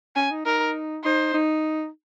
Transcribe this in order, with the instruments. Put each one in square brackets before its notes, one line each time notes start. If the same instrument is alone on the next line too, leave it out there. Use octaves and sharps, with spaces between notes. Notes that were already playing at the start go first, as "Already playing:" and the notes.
[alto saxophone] C#4 [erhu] G#5
[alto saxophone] D#4
[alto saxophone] D#4 [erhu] A#4
[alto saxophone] D#4 [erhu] C5
[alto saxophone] D#4